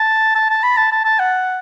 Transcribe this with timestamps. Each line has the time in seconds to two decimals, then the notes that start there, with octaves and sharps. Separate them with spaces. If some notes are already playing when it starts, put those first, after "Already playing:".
Already playing: A5
0.35 A5
0.50 A5
0.63 B5
0.77 A5
0.92 A5
1.05 A5
1.20 F#5